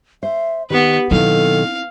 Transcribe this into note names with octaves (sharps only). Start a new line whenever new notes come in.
C5 E5
D#3 B3 G4 B4
B2 D#3 F#3 C4 E4 A4 F5